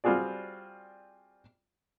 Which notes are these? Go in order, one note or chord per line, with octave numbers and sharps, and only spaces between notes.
G3 C4 F4 F#4 G#4 D5